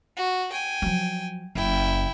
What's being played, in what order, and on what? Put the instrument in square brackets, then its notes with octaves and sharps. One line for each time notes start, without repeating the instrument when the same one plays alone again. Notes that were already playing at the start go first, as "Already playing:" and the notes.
[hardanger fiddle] F#4
G5 G#5
[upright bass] F3 F#3
[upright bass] F#1 [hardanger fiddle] E4 G5